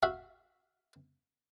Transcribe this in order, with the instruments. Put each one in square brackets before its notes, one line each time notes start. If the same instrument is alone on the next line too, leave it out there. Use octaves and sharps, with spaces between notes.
[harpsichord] F#4 E5 F5